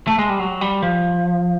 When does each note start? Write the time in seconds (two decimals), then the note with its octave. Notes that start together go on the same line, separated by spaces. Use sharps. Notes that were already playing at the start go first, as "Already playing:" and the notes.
0.07 A3
0.18 G#3
0.29 G3
0.40 F#3
0.61 G3
0.83 F3